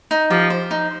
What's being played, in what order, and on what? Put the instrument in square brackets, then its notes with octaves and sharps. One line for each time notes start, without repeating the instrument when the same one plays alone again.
[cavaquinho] D#4
[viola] F3 [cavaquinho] G4
[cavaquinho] C5
D#4